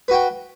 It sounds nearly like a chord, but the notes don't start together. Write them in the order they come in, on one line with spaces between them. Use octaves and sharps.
B4 F#4 G5